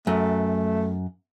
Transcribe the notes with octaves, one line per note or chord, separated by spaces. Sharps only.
F#2 A3